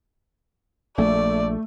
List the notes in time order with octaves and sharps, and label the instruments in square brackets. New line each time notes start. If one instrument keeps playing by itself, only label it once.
[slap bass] A#1 [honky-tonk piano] A3 [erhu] D5